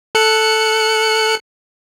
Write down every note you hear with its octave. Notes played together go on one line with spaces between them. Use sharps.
A4 F#6 C#7